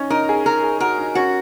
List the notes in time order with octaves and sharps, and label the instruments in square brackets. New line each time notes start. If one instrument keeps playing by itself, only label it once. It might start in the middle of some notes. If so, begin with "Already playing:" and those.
Already playing: [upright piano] C#4 D#4
[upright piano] D#4 [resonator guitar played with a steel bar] A#4
[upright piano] G#4
[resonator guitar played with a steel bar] A#4
[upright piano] G#4
[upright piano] F#4 [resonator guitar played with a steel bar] A#4
[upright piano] D#4
[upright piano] C#4 [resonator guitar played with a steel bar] F#4